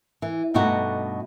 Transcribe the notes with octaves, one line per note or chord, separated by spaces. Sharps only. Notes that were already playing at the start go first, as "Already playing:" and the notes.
E3
G2 B2 A3 D#4 F#4